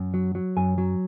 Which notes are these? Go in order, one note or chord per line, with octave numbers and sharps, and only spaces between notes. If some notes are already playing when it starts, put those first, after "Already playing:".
Already playing: F#2
F#3
F#3
F#2 G#5
F#3